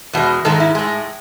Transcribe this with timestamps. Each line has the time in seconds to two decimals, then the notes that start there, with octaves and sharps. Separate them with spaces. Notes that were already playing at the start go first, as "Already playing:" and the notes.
0.13 E2 B2 G#3
0.45 G#2 D#3 G#3 A4
0.60 E4
0.75 A2 G#3